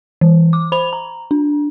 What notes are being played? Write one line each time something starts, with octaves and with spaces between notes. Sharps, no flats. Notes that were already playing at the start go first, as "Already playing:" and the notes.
E3
D6
C5 B5 F7
A#5
D4